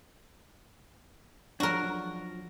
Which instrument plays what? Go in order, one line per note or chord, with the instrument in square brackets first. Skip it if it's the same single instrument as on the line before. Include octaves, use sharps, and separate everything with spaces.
[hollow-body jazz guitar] F3 F#3 D4 [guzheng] F#4 A#4